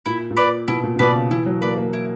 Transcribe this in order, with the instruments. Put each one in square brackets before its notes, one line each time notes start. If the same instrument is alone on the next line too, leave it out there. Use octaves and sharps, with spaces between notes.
[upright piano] A#2 [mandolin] E4
[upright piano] A#2
[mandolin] B4 D5
[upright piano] B2 [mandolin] E4
[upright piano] A#2
A#2
[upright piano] B2 [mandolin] B4 D5
[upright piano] C#3
[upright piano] E3 [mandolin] E4
[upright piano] F#3
[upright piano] A#3 [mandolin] B4 D5
[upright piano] A#3
[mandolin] E4